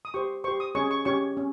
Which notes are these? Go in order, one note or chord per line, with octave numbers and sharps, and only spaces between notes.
D#6
G4 C5 C#6
G4 C5 C#6
D#6
C#4 G#4 C#5 C#6
C#6
C#4 G4 C#5 C#6
C#4